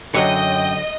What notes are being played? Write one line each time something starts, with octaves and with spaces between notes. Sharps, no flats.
F#2 D3 F#3 C#5 D#5 G5